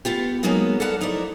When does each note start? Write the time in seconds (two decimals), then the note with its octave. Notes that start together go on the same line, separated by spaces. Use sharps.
0.05 A3 B3 F4 G4
0.43 F#3 G#3 A#3 B3 D#4 F#4
0.80 A4 B4 D5 F5 F#5 A5
1.01 F2 D#4 E4 C5 D5